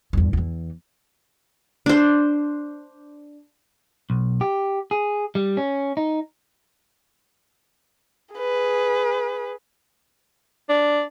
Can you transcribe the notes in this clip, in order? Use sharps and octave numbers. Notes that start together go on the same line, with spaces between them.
E2 G2
E2 E3
D4 C5
B1
G4
G#4
G3
C#4
D#4
G#4 B4
D4